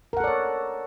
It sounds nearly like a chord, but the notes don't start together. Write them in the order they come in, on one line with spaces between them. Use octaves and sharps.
A#4 F#5 A4 D5 C#5